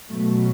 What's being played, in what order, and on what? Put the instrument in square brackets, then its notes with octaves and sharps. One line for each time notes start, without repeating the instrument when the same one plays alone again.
[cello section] B2 F#3 A3